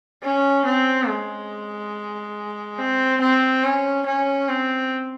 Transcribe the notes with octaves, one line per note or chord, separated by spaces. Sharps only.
C#4
C4
G#3
C4
C4
C#4
C#4
C4